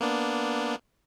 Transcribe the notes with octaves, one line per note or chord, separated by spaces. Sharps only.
A#3 B3 D4